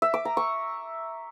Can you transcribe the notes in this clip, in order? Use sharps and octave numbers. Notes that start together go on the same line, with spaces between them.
E5
D6
A#5
C#6